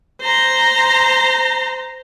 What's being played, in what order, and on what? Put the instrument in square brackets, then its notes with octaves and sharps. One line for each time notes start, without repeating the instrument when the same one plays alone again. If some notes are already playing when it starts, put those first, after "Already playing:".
[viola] C5 A#5